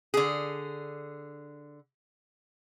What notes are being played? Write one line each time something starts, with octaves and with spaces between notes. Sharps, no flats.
D3 G#4